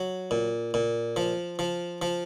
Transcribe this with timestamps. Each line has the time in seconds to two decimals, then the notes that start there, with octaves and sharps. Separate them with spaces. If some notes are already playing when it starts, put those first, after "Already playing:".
Already playing: F#3
0.31 A#2
0.74 A#2
1.16 F3
1.59 F3
2.02 F3